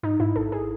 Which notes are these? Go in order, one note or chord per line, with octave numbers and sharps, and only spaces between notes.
G#2 D#4
G#2 E4
G#1 A4
G#4